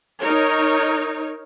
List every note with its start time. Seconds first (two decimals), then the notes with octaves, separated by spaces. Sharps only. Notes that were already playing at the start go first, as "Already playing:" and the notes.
0.20 D#4 A#4 C#5